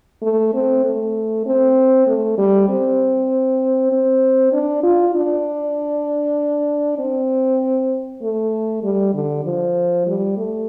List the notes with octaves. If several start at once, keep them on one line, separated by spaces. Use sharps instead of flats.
A3
C4
A3
C4
A3
G3
C4
C4
D4
F4
D4
C4
A3
G3
D3
F3
G3
A3